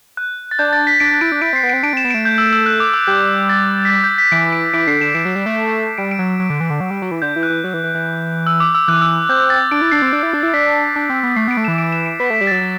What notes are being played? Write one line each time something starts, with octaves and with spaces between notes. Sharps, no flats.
F#6
A6
D4 G6
A6
B6
D4 D7
D4
E4 D7
D4
E4 D7
C4
C7
B3
C4 D7
D4 D7
C4
E7
B3
A3 D7
G6
E6
E6
F#6
D6
E6
G3 G6
A6
B6
A6
G6
B6
E3 D7
D7
E3 D7
D3 C7
D3 E7
C7
E3 D7
F#3
G3
A3
G3 D7
D7
F#3
F#3
D3
E3
D3
F#3
G3
F#3
E3
D3 G6
E3
F#6
E3
F#3
E3
E3
E3
E6
D6
E6
E3 F#6
E6
C4 G6
A6
D4 D7
E4
D4 C7
C4
D4
E4
D4
E4
D4 B6
D4
C4
B3
A3 C7
B3
D7
A3
E3 E7
E3 D7
E7
D7
B3 B6
A3
B6
G3
F#3 A6
F#3